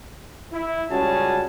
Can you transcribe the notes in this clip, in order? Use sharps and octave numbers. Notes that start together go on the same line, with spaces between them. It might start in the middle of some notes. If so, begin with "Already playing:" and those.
E4
C#2 G3 C#4 F#4 G#4 A5